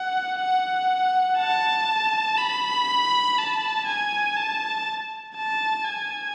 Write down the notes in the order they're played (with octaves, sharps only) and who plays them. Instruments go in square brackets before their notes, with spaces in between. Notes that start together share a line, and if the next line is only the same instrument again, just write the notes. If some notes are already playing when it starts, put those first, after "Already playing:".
Already playing: [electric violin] F#5
F#5
A5
B5
A5
G#5
A5
A5
G#5